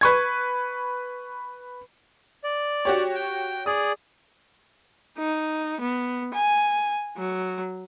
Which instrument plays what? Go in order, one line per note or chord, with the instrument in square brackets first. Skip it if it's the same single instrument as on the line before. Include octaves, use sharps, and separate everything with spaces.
[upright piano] B4 C#6 G#6
[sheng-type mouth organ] D5
[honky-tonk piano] F#4 G4 C#5
[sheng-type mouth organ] G5
[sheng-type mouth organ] G#4 D5 [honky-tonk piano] D#6
[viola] D#4
B3
G#5
F#3